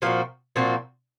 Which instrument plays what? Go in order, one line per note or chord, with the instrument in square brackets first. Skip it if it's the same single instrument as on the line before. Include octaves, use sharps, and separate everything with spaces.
[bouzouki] A#2 F3 C4 F#4
A#2 F3 C4 F#4